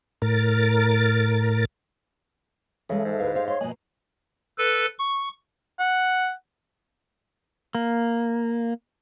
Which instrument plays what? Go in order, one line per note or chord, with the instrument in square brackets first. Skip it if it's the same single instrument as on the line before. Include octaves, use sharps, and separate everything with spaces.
[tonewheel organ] A2 A#4 A6
[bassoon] C#3 [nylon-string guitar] E3 G#3 [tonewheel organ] A4 E5
[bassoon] G#2
[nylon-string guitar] D2 E4 F5 [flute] B4
[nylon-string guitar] A4 C#5 F5 [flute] C5
[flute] C#5 [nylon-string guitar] F5 [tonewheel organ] C6
[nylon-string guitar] B2 F3 A#3 [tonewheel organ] D#5 G#5 F#6
[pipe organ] A4 B4
C#6
[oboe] F#5
[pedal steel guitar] A#3